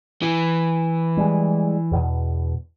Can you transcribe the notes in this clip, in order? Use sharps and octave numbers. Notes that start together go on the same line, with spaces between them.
E3
G3 G#3
E2 B2